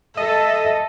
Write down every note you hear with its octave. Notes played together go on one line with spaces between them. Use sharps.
A4 D#5 E5